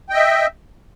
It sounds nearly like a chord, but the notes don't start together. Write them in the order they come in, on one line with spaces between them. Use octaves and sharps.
G5 D#5 E5